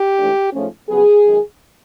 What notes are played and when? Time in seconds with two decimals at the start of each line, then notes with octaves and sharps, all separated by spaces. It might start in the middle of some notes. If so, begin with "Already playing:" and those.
Already playing: G4
0.17 G#2 E3 A3 D4
0.53 G#2 F3 A3 C#4
0.88 F2 C#3 F#3 B3 G#4
1.25 F#2 D#3 G#3